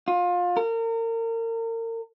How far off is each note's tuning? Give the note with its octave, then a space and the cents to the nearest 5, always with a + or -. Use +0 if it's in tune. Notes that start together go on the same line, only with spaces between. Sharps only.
F4 +25
A#4 -35